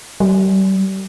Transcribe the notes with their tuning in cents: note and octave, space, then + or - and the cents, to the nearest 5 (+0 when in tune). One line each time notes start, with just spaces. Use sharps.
G3 -35